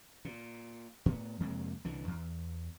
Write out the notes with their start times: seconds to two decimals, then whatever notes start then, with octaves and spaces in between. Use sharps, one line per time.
0.25 A#2
1.06 A2 B3
1.40 F2 C3 G#3 A#3
1.84 C2 D3 E3
2.08 E2